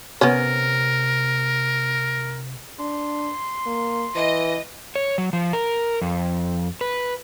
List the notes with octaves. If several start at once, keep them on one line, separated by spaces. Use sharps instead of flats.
C3 B3 C#4 A#4
D4 C6
A#3
E3 D#5
C#5
F#3
F3
A#4
F2
B4